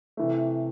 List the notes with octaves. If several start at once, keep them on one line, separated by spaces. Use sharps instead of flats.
C3 E3 A3